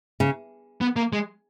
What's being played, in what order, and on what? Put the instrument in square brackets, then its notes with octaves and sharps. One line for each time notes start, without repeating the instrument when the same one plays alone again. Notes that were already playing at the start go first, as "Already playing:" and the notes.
[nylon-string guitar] C#3
[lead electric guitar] B3
A#3
G#3